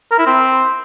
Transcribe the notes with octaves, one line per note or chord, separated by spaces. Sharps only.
A#4
E4
C4